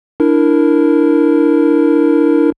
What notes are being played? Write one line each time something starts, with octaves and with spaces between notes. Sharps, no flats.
D4 E4 A#4